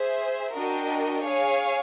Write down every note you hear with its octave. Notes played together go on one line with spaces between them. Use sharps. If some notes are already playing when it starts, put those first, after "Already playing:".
Already playing: G#4 C5 E5
D4 F#4 A#4 D#5 G5
G#4 C#5 F5 G#5